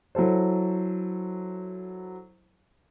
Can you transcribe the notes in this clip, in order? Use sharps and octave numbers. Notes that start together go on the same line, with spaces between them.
F#3 E4 A4 C5